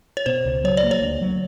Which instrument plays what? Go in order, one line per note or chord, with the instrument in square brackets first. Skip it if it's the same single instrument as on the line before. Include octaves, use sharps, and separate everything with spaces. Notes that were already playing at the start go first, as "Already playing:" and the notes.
[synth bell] C#5
[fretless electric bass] B2 [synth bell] C5
[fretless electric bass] C#2
[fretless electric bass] F#3 [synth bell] C#5
[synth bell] D5
[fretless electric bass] A#3
[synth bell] C#5
[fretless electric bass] D2
F#3